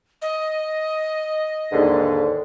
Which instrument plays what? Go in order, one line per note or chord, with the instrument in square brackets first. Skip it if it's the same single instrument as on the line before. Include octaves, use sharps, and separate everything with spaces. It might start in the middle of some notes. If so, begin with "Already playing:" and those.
[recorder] D#5
[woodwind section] D#2 G#2 D3